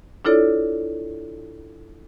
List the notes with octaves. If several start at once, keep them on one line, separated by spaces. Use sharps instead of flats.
D4 E4 F4 A4 C#5 D5